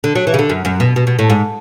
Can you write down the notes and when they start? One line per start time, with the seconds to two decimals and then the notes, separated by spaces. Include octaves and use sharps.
0.04 D3
0.15 F#3
0.27 E3
0.34 C#3
0.39 D3
0.50 F#2
0.65 F#2
0.80 B2
0.96 B2
1.07 B2
1.19 A2
1.30 G#2